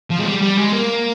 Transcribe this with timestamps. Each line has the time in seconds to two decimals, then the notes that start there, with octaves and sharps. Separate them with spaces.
0.11 F3
0.19 G#3
0.26 G3
0.42 G3
0.58 G#3
0.73 A#3